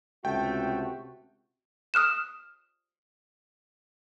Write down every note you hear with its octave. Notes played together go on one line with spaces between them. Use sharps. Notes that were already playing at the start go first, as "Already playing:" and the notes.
C#2 C3 A3 F#4 G5
D#6 F6 F#6 E7